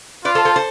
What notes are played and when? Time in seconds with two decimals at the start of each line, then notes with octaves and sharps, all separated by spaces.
0.25 F4 B4 D5
0.35 A4 C5
0.45 A4 C5
0.56 A4 C5